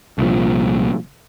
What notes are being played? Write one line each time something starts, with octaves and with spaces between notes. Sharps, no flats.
C2 A#2 F3